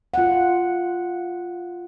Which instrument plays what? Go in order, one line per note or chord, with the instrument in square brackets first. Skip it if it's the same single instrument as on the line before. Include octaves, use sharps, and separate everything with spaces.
[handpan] F4 F#5